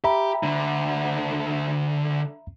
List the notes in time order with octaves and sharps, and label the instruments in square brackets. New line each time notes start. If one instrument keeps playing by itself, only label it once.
[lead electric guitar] G4 [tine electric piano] E5 A#5 B5
[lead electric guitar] D2 D3